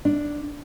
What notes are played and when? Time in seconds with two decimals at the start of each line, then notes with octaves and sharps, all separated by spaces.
0.05 D4